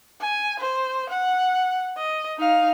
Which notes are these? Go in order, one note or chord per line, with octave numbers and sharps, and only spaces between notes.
G#5
C5
F#5
D#5
D#4 F5